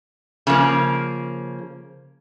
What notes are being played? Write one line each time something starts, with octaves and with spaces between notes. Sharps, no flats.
C#3 F3 A#3